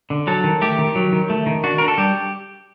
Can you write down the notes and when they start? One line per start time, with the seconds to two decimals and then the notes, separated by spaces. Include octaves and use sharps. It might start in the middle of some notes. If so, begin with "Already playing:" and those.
0.10 D3
0.27 F#3 A4
0.44 D#3
0.61 A3 G4
0.78 D#3
0.95 F#3
1.12 D#3
1.30 A3
1.46 D#3
1.64 D4 F#4
1.78 D4 A#4
1.88 A4
1.98 G3 G4